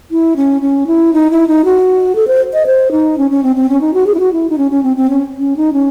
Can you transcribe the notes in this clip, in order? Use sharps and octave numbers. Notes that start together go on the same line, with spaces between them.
E4
C#4
C#4
E4
D#4
E4
D#4
F#4
A4
C5
D#5
C5
D#4
C#4
C#4
C4
C4
C#4
D#4
F#4
G#4
E4
F#4
E4
D#4
C#4
C#4
C4
C4
C#4
C#4
D#4
C#4